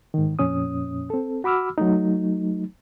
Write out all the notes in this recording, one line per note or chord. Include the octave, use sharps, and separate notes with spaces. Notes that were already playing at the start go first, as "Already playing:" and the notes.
G#2 D#3
F2 A#2 C#4 D#6
C4 A4
F#4 B5 D6 E6 F6
F#3 A3 D#4